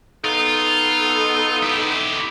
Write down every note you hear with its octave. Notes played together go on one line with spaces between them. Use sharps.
B3 D#4 F4 A4
E4 G4